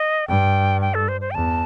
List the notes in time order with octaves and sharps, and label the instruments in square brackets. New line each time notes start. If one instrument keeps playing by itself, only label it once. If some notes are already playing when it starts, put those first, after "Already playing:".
Already playing: [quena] D#5
[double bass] G2 [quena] G5
[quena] G5
A4
C5
C5
G5
[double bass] E2 [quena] A5